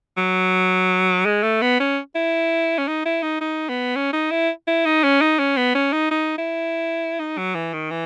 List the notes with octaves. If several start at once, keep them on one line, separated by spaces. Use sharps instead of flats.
F#3
G#3
A3
B3
C#4
E4
C#4
D#4
E4
D#4
D#4
B3
C#4
D#4
E4
E4
D#4
C#4
D#4
C#4
B3
C#4
D#4
D#4
E4
D#4
F#3
E3
D#3
E3